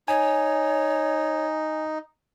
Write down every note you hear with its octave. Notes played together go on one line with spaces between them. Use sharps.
D#4 C#5 G#5